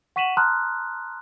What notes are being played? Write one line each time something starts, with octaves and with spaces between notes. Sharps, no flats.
F#5 C#6 B6 D#7 E7 F#7
A5 A#5 C6 D#6 F6 F#6